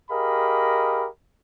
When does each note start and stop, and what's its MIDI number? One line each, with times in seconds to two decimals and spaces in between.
0.11 1.07 67
0.11 1.07 68
0.11 1.07 70
0.11 1.07 75
0.11 1.07 77
0.11 1.07 83